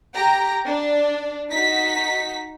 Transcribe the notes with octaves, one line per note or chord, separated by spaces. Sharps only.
G4 A#5
D4
D#4 F#4 B6